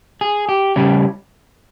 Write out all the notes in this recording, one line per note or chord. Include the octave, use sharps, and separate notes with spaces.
G#4
G4
C#3 G3 C#4 G4